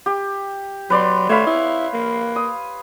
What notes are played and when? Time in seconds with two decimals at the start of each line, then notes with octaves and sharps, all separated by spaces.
0.06 G4
0.90 F#3 B4 D5 C6
1.29 A3 C#5 F5 B5
1.47 E4
1.93 A#3
2.36 D#6